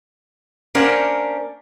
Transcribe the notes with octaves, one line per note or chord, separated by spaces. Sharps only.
A#3 C#4 D4 A#4 C5 F#5